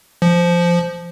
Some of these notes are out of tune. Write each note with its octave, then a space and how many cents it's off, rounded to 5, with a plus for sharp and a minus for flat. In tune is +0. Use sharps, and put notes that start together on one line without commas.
F3 -10